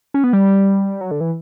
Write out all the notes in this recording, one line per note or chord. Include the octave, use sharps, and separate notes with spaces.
C#4
B3
G3
F#3
D3
E3